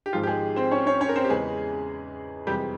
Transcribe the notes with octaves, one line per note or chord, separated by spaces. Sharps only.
G4
G#1 G#2 F3 G#3 F4
G4
G#3 G#4
C4 C5
C#4 C#5
C#4 C#5
C#4 C#5
A#4
C4 C5
G4
E2 C#3 E3 G#3 G#4
F2 C3 E3 G3 G#3 G4